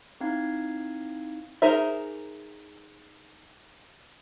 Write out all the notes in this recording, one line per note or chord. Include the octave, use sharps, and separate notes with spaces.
C4 D#4 E4 F5 G#6
D#4 G#4 A#4 C5 E5